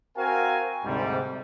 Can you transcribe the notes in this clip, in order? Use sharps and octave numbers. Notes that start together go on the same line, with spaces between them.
C4 F#4 A#4 F5 G5 G#5
D2 G#2 C3 G3